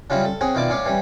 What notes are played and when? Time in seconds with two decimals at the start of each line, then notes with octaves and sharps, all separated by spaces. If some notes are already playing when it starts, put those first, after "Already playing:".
0.10 C#3 F#3 G3 C#4 E4 F4
0.25 A4
0.41 C4 C#4 F#4 G#4
0.55 B2 D#3 E4 F4 D5 D6
0.70 A2 C#4 C#5 D5 F5
0.85 E3 G3 C#4